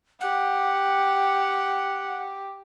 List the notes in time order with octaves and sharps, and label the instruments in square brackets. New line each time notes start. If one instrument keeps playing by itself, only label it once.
[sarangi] G4 [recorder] F#5